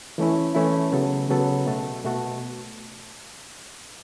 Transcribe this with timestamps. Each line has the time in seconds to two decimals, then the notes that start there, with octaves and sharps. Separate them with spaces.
0.18 E3 A3 C#4 E4
0.55 E3 A3 C#4 E4
0.92 C#3 F#3 B3 A4
1.29 C#3 F#3 B3 A4
1.66 B2 A3 F#4 A4
2.04 B2 A3 F#4 A4